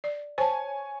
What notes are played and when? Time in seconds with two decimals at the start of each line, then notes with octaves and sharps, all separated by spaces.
0.04 D5
0.38 C5 C#5 G#5 A5